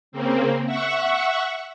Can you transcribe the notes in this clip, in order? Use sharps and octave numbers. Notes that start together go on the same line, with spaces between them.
C#3 A#3 C4
E5 F#5 C#6